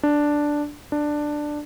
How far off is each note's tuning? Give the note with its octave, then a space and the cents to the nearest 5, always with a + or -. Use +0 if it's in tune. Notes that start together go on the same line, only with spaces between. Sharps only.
D4 +0
D4 +10